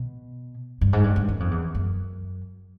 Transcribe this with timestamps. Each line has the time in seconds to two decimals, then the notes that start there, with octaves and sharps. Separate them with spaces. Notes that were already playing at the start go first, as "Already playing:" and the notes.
Already playing: B2
0.81 G2
0.93 G#2
1.04 G2
1.16 G2
1.28 F#2
1.40 F2
1.51 E2
1.75 F#2